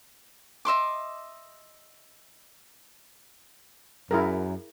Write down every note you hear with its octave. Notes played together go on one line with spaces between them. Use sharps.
D#5 E5 C6 D6
F#2 E4 G#4 A#4